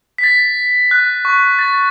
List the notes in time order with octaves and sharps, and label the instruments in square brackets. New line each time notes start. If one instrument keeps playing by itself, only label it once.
[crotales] B6
A6
F#6
C#6
A6